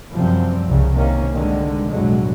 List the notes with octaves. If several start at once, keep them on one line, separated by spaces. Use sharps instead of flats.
F#2 C3 F3 G3 C4
C2 C#3
C3 D#3 A#3 C#4
C2 G#2 D3 D#3 G#3
B1 F2 A2 D3 F#3 G#3